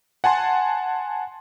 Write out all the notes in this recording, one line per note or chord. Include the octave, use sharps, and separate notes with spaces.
F#5 G#5 A5 C6